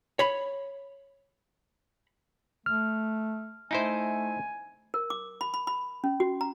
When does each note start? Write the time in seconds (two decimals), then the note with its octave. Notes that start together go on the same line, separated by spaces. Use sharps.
0.19 C#5 B5
2.66 A3 F6
3.71 A3 D#4 E4 C5 G#5
4.94 A#4
5.10 D6
5.41 B5
5.54 B5
5.67 B5
6.04 C#4
6.20 F#4
6.41 A#5